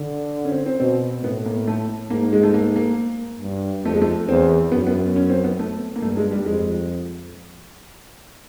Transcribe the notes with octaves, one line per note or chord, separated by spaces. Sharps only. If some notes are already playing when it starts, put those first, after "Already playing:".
Already playing: D3
C#4
C4
C4
B2 C4
A2 B3
A#3
A3
G#2 A#3
G#3
A3
A#3
A#3
G2
F2 A3
G#3
A3
E2 C4
F#2 B3
B3
C#4
C4
B3
A3
A#3
G2 A3
G#3
G3
F2 G#3